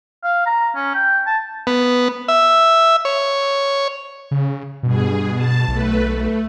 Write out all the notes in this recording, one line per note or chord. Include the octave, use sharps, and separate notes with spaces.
F5
A#5
C#4
G5
A5
B3
E5
C#5
C#3
G2 B2 G#4
A5
B1 A3 B4
A3